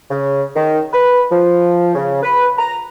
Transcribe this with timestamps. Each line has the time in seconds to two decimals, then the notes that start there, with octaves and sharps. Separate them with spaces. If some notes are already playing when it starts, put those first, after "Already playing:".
0.11 C#3
0.56 D#3
0.93 B4
1.31 F3
1.95 C#3
2.23 B4
2.58 A#5